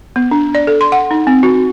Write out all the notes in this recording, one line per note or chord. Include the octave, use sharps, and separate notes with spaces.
B3
D4
D5
A4
C6
F#5
D#4
C4
F#4